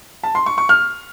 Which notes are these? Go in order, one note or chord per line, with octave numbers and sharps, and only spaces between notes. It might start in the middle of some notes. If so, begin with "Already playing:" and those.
A5
C6
C#6
C#6
F6